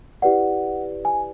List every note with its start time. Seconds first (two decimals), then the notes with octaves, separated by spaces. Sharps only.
0.22 E4 G4 B4 D5 F#5
1.05 G#5